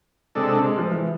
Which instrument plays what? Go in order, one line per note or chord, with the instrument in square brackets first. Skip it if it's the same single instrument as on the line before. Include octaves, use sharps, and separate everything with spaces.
[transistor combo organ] C3 G#3 D4 A4
[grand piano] G#3
F3
E3